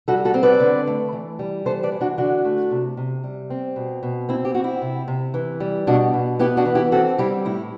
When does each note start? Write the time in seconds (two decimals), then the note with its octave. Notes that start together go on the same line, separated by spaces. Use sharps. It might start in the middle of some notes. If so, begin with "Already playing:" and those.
0.08 G3 F#4 A4
0.25 F#4 A4
0.34 C4
0.43 B4 D5
0.60 D3
0.87 A3
1.12 E3
1.39 G3
1.65 E3 A4 C5
1.83 B4 D5
1.92 E3
2.01 D4 F#4
2.18 D3 D4 F#4
2.45 A3
2.71 C3
2.97 C3
3.24 G3
3.50 C4
3.76 B2
4.03 B2
4.29 C4 E4
4.45 G4
4.54 C4 F#4
4.64 E4
4.81 C3
5.08 C3
5.34 E3
5.60 G3
5.87 B2 D4 F#4
6.14 B2
6.39 B3 E4 G4
6.57 D4 F#4
6.65 E3
6.75 E4 G4
6.92 C4 F#4 A4
7.18 G3 E4 G4
7.45 A2 E4